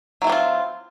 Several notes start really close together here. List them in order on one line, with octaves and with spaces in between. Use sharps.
F#3 E4 C4 D4 F4